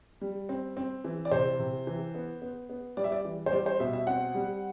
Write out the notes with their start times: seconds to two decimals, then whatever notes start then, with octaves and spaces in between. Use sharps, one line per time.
0.21 G3
0.49 C4
0.77 C4
1.04 E3
1.25 D5
1.31 C3 C5
1.59 C3
1.87 E3
2.15 B3
2.42 B3
2.70 B3
2.97 G3 D5
3.04 E5
3.12 D5
3.25 E3
3.46 C5
3.52 G3 D5
3.66 C5
3.80 B2 E5
3.93 E5
4.07 C4 F#5
4.35 G3